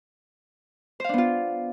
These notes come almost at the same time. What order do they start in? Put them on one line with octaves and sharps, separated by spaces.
C5 F5 D4 B3 F4